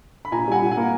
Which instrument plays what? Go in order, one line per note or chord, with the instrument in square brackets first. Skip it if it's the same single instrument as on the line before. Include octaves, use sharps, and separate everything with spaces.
[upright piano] B5
A#2 G#5 A#5
G3 F#5 G#5
A#2
F#5 G#5
A#3